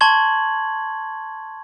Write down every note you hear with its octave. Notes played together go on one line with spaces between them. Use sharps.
A5 C6 C#6 G#6 F#7